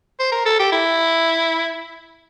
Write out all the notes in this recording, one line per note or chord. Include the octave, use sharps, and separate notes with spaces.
C5
A#4
A4
G4
E4